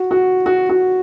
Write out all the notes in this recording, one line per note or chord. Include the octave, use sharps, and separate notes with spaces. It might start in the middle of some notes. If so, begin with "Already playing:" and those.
Already playing: F#4
F#4
F#4
F#4